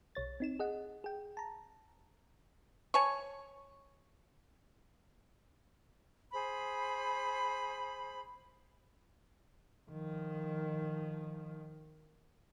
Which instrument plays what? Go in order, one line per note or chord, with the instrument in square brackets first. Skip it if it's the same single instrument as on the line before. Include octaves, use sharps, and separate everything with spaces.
[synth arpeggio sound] B1 C#5 A6
C4 D#4 E7
G#4 D#5 F#5
G#4 G5
A5 A#5
[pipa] C#5 G#5 A5 C#6
[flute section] G#4 C5 B5
[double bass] D#3 F3